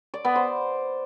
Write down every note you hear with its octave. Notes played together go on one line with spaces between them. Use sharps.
D5
B3
C5